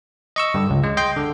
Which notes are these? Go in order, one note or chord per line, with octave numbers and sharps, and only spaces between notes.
D#5 C#6 E6
G2 D3
C#2
G#3
D#5 G5 C6
D3